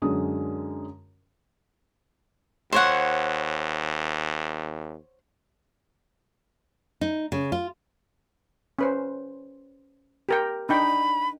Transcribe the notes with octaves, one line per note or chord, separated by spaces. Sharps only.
F#2 D3 G#3 C#4 D#6
D#2 C5 C#5 F#5
D#4
C#3
F4
C#4 B4 C5
G4 A#4 G5
D4 D#4 G5 B5